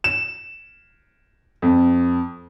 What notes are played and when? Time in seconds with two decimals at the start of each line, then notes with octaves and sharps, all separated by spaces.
0.04 E7
1.62 F2